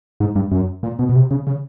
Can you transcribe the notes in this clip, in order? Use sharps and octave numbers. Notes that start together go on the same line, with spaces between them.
G#2
G2
F#2
A#2
B2
B2
C3
C#3
C#3